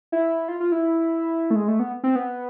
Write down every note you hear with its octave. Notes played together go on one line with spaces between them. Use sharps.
E4
F4
F4
E4
A3
G#3
A3
B3
C4
B3